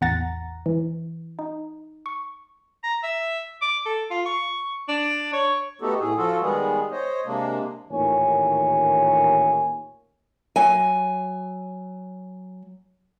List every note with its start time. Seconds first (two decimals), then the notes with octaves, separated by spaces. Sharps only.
0.01 A1 E2 F#5 A#5 A6 A#6
0.66 E3
1.39 D#4
2.06 C#6
2.83 A#5
3.03 E5
3.62 D6
3.85 A4
4.11 F4
4.26 C#6
4.89 D4
5.33 C#5
5.81 A3 B3 D#4 F#4 G4 A4
6.00 A2 G#4
6.18 F3 F4 F#4 A4
6.41 D#3 G3 G#3 B3 G#4
6.91 C5 C#5 D#5
7.26 C3 G#3 A#3 D4
7.91 A1 D#2 A#2 D#3 C#5 G#5
10.56 F#3 G#5